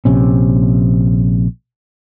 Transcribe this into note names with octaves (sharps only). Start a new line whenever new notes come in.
A#1 C3 C#4